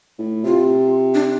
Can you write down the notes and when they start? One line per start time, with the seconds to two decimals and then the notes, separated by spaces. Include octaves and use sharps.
0.19 A2
0.45 C3 F4
1.14 D4